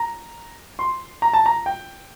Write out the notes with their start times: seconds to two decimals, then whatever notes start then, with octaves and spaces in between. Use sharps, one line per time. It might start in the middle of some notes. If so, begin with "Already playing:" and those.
Already playing: A#5
0.79 C6
1.22 A#5
1.33 A5
1.46 A#5
1.66 G5